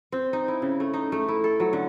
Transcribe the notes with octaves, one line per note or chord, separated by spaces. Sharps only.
C4
D#4
E4
C#3
A3
D#4
A3
E4
A4
F#3
D3